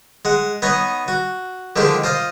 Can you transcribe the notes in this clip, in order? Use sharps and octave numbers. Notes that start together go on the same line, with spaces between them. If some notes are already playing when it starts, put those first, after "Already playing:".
G#3 F#5
B3 D#4 C#5 D#5
F#4
D3 D#3 F3 G#3 G4
F4 C5 D#5 F5